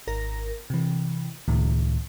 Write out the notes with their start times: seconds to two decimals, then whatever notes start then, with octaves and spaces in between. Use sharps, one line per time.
0.07 G#1 A#4 A#6
0.70 C3 E3
1.48 C#2 A2 D#3